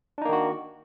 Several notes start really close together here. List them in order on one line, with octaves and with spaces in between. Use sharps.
D4 D#4 A#3 D#3 F#4